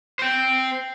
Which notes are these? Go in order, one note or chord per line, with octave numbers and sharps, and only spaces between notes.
C5 G5